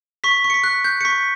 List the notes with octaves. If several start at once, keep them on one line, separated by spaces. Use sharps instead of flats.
C#6 B6
C#6
C#7
B6
F#6
F#6 G6
C#7
C#6 B6